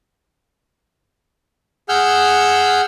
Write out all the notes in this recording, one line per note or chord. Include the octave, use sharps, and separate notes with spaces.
G#4 F#5 E6 F6 G6